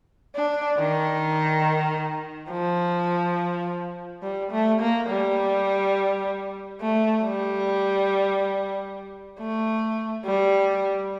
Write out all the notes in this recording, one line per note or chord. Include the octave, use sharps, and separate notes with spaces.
D4
D#3
F3
G3
A3
A#3
G3
A3
G3
A3
G3